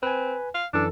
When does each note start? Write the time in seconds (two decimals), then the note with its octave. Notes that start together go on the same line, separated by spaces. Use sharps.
0.03 C4 B4 G#5
0.55 F5
0.74 F#2 E3 D4 A4